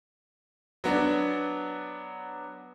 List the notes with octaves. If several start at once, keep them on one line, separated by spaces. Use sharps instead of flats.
F#3 B3 D4